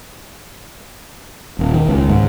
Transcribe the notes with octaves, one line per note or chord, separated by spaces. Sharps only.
D#1
D#3
C#2
G#2